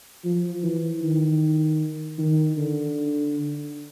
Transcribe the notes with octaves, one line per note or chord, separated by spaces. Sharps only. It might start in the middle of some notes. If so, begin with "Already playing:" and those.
F3
E3
D#3
D#3
D3